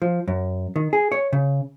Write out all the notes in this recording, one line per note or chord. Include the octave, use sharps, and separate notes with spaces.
F3
F#2
D#3
G#4
C#5
C#3